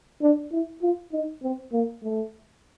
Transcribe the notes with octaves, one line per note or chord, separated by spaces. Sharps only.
D4
E4
F4
D#4
C4
A#3
A3